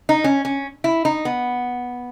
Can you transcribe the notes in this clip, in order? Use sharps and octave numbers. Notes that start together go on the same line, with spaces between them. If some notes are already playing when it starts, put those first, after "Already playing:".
D#4
C#4
C#4
E4
D#4
B3